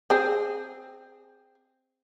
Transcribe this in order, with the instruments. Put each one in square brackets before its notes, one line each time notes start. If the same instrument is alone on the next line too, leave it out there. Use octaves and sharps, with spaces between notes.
[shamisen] C4 G#4